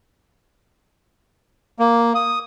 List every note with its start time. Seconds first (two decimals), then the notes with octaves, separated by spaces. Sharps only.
1.79 A#3
2.15 D#6